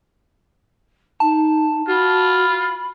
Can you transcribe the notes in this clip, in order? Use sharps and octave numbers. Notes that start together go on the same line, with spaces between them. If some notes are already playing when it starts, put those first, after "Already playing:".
D#4 A5
F4 F#4 B5